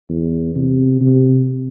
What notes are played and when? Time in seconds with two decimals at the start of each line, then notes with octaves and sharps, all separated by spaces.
0.09 E2
0.55 C3
1.01 C3